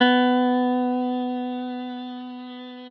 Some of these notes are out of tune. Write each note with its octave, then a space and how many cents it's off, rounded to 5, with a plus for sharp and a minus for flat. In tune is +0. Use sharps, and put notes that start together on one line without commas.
B3 +20